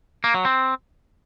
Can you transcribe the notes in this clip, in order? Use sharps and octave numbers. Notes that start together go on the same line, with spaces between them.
A#3
F#3
C4